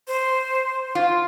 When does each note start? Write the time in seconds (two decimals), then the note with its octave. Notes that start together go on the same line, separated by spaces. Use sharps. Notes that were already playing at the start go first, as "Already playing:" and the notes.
0.08 C5
0.95 F4